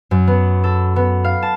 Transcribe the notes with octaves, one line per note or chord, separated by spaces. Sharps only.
F#2
B3
A4
B3
F5
A5